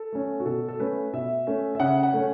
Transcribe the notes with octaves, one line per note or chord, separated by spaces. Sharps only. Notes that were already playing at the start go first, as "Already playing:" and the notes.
Already playing: A4
A3 C#4
F#4
B2 A4
A4
A3 C#4 B4
B2 E5
A3 C#4
E5
C#3 F#5
F#5
A3 C#4